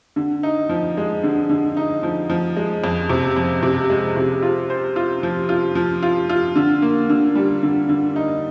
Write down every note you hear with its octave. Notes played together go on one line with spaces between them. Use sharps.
D3
D#4
F3
G#3
D3
D3
D#4
F3
F3
G#3
F2
C3
F2
C3
G#3
C3
F4
C5
F4
F3
F4
F3
F4
F4
D3
A#3
D3
G3
D3
D3
D#4